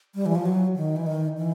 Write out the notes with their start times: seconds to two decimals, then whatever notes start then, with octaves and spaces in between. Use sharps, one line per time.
0.15 G3
0.26 E3
0.35 F3
0.46 F#3
0.76 D#3
0.96 E3
1.06 D#3
1.37 E3